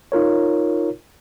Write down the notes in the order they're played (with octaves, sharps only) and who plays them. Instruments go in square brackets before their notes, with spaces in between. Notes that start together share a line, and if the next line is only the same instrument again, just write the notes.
[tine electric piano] D#4 F4 A#4 C#5